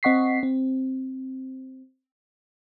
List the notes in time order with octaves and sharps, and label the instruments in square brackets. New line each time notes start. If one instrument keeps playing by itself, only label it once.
[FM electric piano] C4 D#5 F#5 C#6 B6 C7
C4